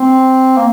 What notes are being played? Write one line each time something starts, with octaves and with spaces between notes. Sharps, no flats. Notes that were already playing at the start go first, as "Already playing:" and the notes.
Already playing: C4
A#3